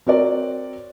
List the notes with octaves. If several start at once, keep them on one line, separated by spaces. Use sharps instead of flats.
C4 F#4 A#4 C#5 D5